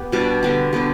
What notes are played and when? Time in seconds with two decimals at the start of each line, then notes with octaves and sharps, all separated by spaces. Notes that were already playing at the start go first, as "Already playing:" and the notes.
Already playing: B3 G4
0.12 B2 G3 D4
0.43 D3 B3 G4
0.73 D3 B3 G4